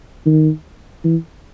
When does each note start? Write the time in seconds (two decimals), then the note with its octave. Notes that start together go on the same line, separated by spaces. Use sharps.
0.26 D#3
1.04 E3